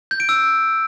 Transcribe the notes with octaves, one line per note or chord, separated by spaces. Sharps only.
G6
D7
E6